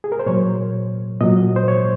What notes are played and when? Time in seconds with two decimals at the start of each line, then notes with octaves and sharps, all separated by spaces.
0.04 G#4
0.12 A#4
0.19 C5
0.26 A#2 F#3 C#5
1.21 A#2 F#3 D#5
1.56 C5
1.68 C#5